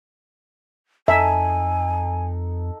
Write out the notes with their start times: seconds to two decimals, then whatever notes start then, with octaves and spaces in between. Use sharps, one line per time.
1.08 F2 D#4 A4 E5 G#5